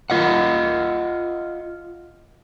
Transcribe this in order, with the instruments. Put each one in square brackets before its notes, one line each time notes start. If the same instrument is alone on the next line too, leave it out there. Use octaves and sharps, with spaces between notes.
[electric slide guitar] F4 D#5 F#5